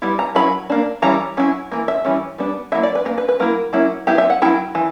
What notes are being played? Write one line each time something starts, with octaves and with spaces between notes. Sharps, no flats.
G3 B3 E4
A#5
F#3 C#4 E4 B5
A#3 D4
E3 G3 C#4 A#5
F#3 C#4 E4
E3 A#3
E5
E3 G3 C#4
G3 B3 D4
F#3 A#3 E4 E5
D5
B4
A#3 D4 A#4
B4
B4
F#3 A#3 E4 A#4
F#3 A#3 C#4 E4
F#3 B3 E4 G4
E5
F#5
F#3 C#4 E4 G5
E3